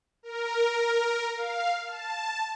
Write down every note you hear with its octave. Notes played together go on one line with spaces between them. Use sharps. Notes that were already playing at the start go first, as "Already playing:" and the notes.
A#4
F5
A5